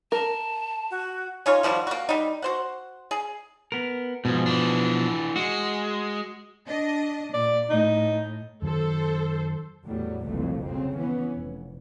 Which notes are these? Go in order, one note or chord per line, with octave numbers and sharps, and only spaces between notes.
A#4 A5
F#4
C#4 D#4 F4 C#5
D#3 F3 G3 F#4
A#3 F#4
G3 D#4
F#4 C5 F#5
G#4
B3 A#4
G#2 B2 F3
E3 D4
G#3 F#4
D4 D#5
A#2 D5
A2 D#4
F#2 D#3 F#3 A4 C5
E2 A2 F#3 G3
F#1 C2 F2 A#2 E3 A3
C#3 F#3 C4
E3 B3 C#4
F1